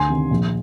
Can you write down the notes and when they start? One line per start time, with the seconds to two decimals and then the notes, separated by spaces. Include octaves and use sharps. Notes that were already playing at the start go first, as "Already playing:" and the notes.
Already playing: D2 G#5 C6
0.10 C3 D#3
0.30 A#1